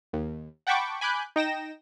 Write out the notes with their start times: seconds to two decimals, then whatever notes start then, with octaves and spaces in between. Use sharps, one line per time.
0.13 D#2
0.67 F#5 G5 A5 B5 C#6 D6
1.01 G#5 B5 D6 F#6 G6
1.36 D#4 G5 A#6 E7